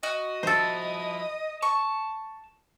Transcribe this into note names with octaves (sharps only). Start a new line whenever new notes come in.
F#4 D#5
F3 E4 A4 C5
A5 C#6